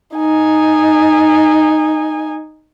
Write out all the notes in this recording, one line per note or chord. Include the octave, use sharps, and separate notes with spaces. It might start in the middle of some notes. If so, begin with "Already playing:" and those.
D#4 G#5